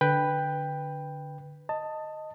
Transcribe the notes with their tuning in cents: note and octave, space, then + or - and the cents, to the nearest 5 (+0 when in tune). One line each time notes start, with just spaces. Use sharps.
D3 +0 B4 +0 G5 +10
D#5 +0 A5 +15